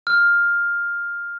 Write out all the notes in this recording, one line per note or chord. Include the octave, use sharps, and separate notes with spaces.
F6